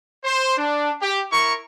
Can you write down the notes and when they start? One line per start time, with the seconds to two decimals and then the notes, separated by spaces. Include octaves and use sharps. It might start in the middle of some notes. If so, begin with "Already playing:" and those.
0.24 C5 C6
0.57 D4
1.01 G4
1.32 E4 A#4 C#6